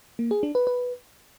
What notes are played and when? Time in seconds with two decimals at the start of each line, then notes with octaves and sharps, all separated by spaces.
0.19 A#3
0.31 G#4
0.43 D4
0.55 B4
0.67 B4